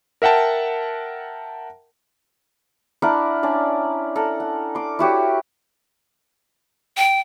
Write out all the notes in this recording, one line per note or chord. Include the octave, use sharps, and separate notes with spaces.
A#4 E5 F#5 G5 A5
D4 E4 A#4 F#5
C#4 D4 D5
A4 A#4 F#5
F#5
C6 D6
E4 F#4 G4 C#5
G5